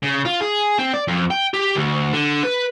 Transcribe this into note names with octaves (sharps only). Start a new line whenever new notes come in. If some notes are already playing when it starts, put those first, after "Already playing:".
C#3
F4
G#4
C4
D5
F2
G5
G4
D2
D3
B4